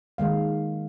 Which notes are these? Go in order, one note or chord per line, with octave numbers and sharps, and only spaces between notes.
D#3 G#3 F5